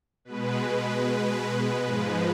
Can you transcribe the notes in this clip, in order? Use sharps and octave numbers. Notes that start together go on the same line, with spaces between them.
B2 G#3 B4
G#2 F3 G#3